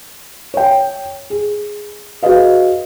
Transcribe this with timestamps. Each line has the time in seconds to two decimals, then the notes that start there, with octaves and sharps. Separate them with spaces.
0.54 C#5 G5
1.30 G#4
2.23 F#4 G#4 B4 D#5 F5